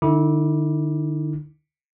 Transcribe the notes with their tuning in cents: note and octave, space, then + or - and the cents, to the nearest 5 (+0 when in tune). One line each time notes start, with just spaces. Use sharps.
D3 +40 E4 -25 D6 +0